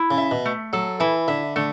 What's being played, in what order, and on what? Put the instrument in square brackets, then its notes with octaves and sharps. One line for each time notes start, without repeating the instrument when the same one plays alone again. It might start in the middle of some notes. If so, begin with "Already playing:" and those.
Already playing: [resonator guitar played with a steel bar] E4
[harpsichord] C#3
[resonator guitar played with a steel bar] E5
[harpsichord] B2
[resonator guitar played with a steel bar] A3
[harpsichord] F#3 [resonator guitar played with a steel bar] A4
[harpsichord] E3 [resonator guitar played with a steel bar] E4
[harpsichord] D3 [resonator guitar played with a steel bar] E5
[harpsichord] D3 [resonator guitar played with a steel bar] A3